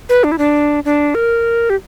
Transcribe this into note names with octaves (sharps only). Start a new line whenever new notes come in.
B4
D4
E4
D4
D4
A#4
G4